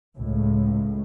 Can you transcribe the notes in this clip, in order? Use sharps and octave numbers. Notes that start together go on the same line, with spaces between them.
C#2 A2